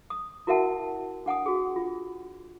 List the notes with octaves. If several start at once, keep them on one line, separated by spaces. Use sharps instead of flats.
D#6
E4 F#4 A#4 E5 F#5 A5
D4 F#5 G#5 D#6
F#4 G#4
F4